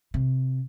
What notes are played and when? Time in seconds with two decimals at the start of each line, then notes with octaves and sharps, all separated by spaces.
0.14 C3